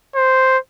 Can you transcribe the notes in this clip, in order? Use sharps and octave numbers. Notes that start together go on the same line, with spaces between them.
C5